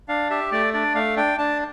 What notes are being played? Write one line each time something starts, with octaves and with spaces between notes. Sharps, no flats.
D4 F5
G4 E5
A3 D5
D4 D5
A3 F5
D4 G5
D4 A5